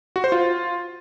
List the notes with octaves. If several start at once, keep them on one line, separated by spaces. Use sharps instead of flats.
F#4
C5
F4